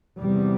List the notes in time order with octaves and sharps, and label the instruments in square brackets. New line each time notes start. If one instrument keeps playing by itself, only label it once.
[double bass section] E2 C3 G3